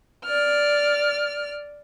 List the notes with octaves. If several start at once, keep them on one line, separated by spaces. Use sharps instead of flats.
D5 F6